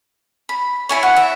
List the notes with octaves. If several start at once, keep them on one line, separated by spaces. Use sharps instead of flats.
B5
E4 C#5 G#5
F#5
E5